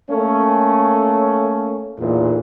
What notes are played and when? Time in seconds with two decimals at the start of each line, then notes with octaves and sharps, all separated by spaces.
0.10 A3 A#3 C#4
1.99 B1 E2 A#2